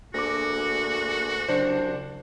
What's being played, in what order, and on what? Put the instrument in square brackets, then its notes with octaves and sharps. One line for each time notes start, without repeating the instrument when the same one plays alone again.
[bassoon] D2 [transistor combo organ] A#3 D4 G#4 [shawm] F#4 [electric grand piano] D6 A#6
[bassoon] C2 [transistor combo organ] C#3 F#3 [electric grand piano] D4 C5